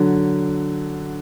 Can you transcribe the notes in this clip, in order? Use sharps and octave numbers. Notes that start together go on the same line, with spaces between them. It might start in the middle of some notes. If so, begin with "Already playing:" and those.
Already playing: D3 F#3